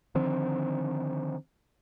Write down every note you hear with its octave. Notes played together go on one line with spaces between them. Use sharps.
D3 D#3 F3 C4